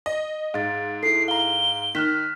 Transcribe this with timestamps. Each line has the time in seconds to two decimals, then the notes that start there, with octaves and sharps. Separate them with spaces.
0.06 D#5
0.54 G#2 F5 A6
1.03 E4 A4 C7
1.28 F5 A#5 G7
1.95 D#3 F6 F#6 B6